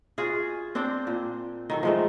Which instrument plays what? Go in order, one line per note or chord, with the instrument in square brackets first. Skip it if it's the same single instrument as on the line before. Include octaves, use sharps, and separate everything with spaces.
[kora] F4 F#4 G#4
C4 D4 C5 G5
A#2
D#3 F#3 A4
F3 G#3 A3